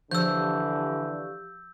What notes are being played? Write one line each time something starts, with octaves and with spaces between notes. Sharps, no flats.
D3 E3 F3 G4 F5 C#6 E6 G6